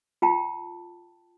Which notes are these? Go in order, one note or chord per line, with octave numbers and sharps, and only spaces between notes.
F4 G5 A5